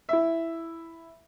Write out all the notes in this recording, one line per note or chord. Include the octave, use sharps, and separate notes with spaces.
E4 E5